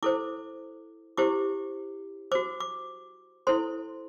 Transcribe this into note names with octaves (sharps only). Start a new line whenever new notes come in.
E4 A4 C5 D6
E4 G4 C5 D6
F#4 C5 D6
D6
E4 A4 C5 C6